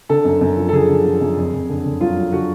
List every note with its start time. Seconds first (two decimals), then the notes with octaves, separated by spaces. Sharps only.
0.10 D3 A4
0.25 F#2
0.41 F#2
0.57 F3
0.69 A4
0.73 D3 G#4
0.89 D3
1.05 F3
1.21 F#2
1.37 F2
1.53 F2
1.70 D3
1.85 D3
2.01 F#3 F4
2.17 F#3
2.33 D3 F#4